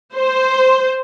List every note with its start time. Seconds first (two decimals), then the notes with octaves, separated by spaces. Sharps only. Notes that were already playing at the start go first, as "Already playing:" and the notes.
0.15 C5